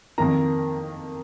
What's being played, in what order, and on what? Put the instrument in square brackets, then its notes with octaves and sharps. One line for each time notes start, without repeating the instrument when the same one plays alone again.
[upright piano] F2 D#3 A#3 A#5